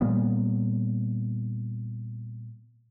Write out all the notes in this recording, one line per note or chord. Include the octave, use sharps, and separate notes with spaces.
A#2 G3 A#3 B3